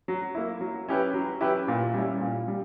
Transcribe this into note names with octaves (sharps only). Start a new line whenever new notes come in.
F#3
A#3 E4
F#3
C#4 E4 G4 B4
F#3
C#4 E4 G4 B4
A#2
G3 C#4 E4
A#2
G3